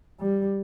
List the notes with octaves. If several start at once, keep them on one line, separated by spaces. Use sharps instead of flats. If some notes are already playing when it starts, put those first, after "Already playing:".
G3